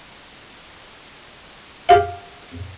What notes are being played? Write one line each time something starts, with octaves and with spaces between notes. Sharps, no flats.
G4 F5